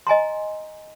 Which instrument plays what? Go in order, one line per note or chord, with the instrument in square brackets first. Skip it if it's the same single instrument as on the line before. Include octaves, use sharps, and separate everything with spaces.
[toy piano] D#5 G#5 A#5 C6